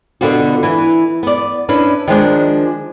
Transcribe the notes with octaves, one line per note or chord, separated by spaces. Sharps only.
B2 D3 B3 F4 F#4
E3 E4
B3 D5
C#4 D4 E4 B4
D#3 F3 G#3 D4